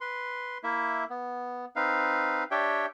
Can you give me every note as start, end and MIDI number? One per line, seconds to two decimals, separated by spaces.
0.01 0.58 71
0.01 0.58 84
0.64 1.04 58
0.64 1.04 64
0.64 1.04 76
1.10 1.65 59
1.76 2.44 60
1.76 2.44 63
1.76 2.44 71
1.76 2.44 77
2.51 2.86 62
2.51 2.86 67
2.51 2.86 73
2.51 2.86 76
2.51 2.86 79